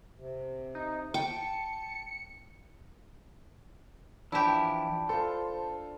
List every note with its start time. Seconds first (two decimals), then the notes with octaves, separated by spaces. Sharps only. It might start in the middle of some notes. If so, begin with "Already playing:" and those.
0.17 C3
0.75 D#4
1.14 G5 A5 C#7
4.32 E3 F3 D4 E4 G4 A5
5.09 F4 A4 C5